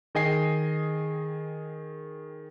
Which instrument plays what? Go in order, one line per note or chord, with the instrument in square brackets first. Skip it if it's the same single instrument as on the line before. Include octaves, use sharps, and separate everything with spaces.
[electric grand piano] D#3 G#4 D#5 G5 G#5 C7